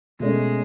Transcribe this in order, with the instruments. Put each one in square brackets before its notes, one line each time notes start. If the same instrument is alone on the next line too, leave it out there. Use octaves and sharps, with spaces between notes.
[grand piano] B2 A3 C#4 [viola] G#3